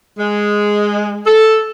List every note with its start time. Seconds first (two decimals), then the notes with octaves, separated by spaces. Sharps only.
0.18 G#3
1.26 A4